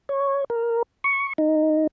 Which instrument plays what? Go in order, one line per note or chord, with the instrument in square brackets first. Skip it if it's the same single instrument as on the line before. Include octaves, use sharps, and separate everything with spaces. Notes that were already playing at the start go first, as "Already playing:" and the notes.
[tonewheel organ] C#5
A#4
C#6
D#4